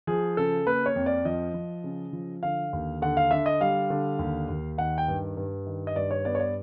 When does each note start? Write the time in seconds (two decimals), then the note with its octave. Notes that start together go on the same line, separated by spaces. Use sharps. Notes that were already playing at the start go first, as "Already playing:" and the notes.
0.07 F3 G#4
0.37 C#3 A4
0.67 A#3 B4
0.86 C#5
0.96 F2
1.06 D5
1.25 F3 D#5
1.54 F3
1.84 C#3
2.13 F3
2.43 D3 F5
2.73 D#2
3.02 D3 F#5
3.17 F5
3.31 D3 E5
3.46 D#5
3.61 G3 F5
3.90 D3
4.19 D#2
4.49 D#2
4.78 D#3 F#5
4.98 G5
5.08 G2
5.37 G2
5.67 D#3
5.87 D#5
5.96 G2 D5
6.11 C#5
6.25 B3 D5
6.35 C#5
6.40 D5